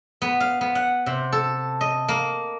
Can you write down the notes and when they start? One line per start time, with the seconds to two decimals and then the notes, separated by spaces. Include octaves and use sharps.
0.22 B3
0.40 F5
0.61 B3
0.75 F#5
1.06 C3
1.32 A4
1.81 D#5
2.08 A#3